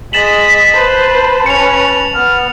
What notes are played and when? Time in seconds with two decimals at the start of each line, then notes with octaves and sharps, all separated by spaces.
0.13 G#3 D#5 A6 B6 E7 F#7
0.74 B4 C5 A5
1.46 C#4 B4 C#7 F7
2.14 B3 F6